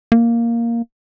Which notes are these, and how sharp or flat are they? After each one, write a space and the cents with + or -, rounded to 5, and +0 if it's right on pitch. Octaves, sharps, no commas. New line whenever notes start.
A#3 +0